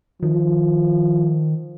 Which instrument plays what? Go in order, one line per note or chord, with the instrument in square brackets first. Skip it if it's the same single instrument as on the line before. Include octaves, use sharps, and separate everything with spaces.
[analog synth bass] D#3 [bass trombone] F3